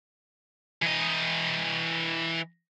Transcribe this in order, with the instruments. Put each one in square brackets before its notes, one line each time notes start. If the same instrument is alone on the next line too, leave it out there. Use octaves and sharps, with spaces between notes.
[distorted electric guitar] E3 D#5